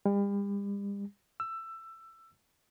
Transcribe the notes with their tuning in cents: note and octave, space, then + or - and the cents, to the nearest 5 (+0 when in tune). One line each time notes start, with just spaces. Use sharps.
G3 +40
E6 +15